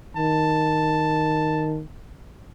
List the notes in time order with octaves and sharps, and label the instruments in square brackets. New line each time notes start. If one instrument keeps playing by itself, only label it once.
[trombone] D#3 [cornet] A5